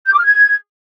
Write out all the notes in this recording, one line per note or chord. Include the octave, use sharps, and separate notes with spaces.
G6
D6
F6
G#6